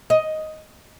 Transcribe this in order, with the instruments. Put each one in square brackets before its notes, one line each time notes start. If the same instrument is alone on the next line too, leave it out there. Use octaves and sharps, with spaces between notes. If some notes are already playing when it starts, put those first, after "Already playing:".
[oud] D#5